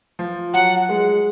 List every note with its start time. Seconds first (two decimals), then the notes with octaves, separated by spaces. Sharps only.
0.19 F3
0.53 F#3 F#5
0.89 G#3